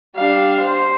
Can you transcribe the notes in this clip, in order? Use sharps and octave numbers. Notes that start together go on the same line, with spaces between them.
G3 D4 F5
C5